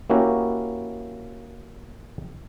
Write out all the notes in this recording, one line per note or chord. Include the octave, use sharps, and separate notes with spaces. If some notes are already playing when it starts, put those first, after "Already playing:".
A#3 C#4 E4 F#4 G4 A#4